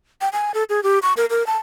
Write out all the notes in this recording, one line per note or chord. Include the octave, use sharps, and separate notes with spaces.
G5
G#5
A4
G#4
G4
C#6
A#4
A#4
A5